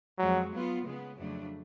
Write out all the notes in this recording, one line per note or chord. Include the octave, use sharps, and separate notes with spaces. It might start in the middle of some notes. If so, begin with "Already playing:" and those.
F2 F3 F#3 G#3
F#3 B3 F4
C#3 G#3 B3
F2 C#3 F#3 A3 D4